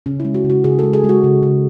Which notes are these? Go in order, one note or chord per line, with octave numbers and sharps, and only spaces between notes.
C#3 C#4
G#3 E4
F#4
C#3
F#4
C#3 G#4
G#3 A4
G#4
G#3 F#4
C#3
C#3